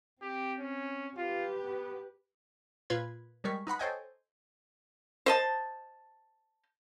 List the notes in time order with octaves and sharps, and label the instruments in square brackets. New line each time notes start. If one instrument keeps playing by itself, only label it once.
[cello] C4 [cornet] G4
[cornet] C#4
[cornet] F4 [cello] G4 B4
[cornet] B3
[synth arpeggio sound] A#2 F4 B4 C6 G#6
G3 G#3 A#4 C#6 B6
D#4 B4 F#5 B5
A4 C5 C#5 D#5 G5 G#5
[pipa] C5 D#5 A5